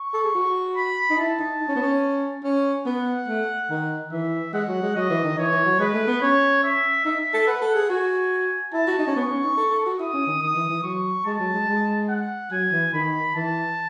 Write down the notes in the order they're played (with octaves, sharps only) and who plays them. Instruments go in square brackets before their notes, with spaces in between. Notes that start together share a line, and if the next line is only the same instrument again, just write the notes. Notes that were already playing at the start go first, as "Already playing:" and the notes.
Already playing: [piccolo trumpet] C#6
[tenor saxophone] A4
G#4
F#4
[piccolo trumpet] B5
[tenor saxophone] D#4
[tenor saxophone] E4 [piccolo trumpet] A5
[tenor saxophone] D#4
D#4
C#4
B3
C#4
C#4
[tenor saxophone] B3 [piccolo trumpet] F#5
[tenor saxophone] A3
D#3
[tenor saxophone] E3 [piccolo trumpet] E5
[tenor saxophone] G#3 [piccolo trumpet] F#5
[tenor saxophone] F#3
G#3
[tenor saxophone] F#3 [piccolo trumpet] D#5
[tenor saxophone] E3
D#3
[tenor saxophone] E3 [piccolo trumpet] C#5
[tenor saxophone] E3
F#3
[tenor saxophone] G#3 [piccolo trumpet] B4
[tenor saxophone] A3
B3
[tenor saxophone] C#4 [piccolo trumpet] C#5
[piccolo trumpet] E5
[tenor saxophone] D#4 [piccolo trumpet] E5
[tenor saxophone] A4
[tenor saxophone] B4 [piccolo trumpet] F#5
[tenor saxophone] A4
G#4
[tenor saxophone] F#4 [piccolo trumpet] G#5
[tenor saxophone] E4 [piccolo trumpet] A5
[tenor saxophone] F#4
D#4
C#4
[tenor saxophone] B3 [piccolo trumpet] C#6
[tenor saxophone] C#4
D#4
A4
A4
F#4
[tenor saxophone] E4 [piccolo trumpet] D#6
[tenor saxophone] C#4
D#3
[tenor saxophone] D#3 [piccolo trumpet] D#6
[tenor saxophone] E3
E3
[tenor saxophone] F#3 [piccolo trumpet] C#6
[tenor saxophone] G#3 [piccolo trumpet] A5
[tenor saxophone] F#3
G#3
G#3
[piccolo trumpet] F#5
[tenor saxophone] F#3 [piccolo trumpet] G#5
[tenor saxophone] E3
[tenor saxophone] D#3 [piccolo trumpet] B5
[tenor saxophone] E3 [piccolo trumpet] A5